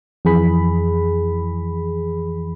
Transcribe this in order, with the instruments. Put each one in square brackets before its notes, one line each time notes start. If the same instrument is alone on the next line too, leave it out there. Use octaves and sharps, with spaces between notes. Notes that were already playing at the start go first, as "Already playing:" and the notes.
[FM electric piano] F2 E3 G#4 B5